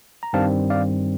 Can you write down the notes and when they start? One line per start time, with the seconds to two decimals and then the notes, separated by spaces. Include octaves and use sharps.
0.23 A#5
0.33 G2 D#3 G3 C4 F5 A5
0.70 D5 F5